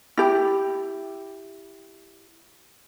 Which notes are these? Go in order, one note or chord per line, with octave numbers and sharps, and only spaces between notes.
E4 G4